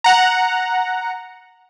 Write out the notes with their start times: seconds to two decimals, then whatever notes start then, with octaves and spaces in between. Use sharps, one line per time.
0.04 F#5 A#5